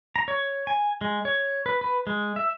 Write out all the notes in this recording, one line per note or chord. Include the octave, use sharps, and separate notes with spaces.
A#5
C#5
G#5
G#3
C#5
B4
B4
G#3
E5